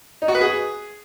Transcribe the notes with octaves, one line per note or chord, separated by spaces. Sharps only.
D#4
F#4
B4
G#4